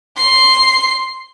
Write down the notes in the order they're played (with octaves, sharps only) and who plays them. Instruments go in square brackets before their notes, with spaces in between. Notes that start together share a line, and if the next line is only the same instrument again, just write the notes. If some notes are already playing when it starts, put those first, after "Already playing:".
[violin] C6 C7